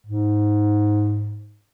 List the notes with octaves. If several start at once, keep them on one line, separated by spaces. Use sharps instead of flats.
G#2